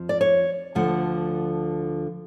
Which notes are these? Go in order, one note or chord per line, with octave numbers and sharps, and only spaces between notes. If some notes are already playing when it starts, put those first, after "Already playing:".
Already playing: F2 F3
D5
C#5
D2 D3 F3 F#5